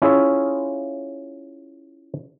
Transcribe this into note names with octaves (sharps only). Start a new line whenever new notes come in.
C#4 E4 F4 G#4 C#5 E5